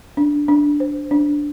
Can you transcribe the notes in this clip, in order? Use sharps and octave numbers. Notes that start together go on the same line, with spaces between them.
D4
D4
C5
D4